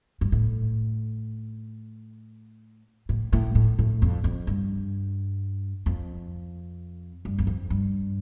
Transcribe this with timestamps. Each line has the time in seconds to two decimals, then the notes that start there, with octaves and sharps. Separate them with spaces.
0.21 G2
0.32 A2
3.09 A2
3.33 A2
3.55 A2
3.79 A2
4.02 F2
4.24 F2
4.47 G2
5.86 F2
7.25 G2
7.39 E2
7.47 F2
7.70 G2